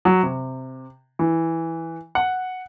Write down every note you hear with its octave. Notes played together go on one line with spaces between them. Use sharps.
F#3
C3
E3
F#5